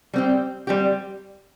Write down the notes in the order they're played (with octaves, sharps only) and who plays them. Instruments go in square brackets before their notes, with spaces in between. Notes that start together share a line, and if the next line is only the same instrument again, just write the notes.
[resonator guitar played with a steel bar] G3 C4 G4
G3 C4 G4